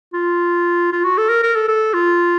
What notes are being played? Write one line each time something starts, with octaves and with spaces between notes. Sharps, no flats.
F4
F4
F#4
A4
A#4
A#4
A4
A4
F4